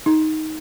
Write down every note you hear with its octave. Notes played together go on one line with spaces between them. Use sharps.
D#4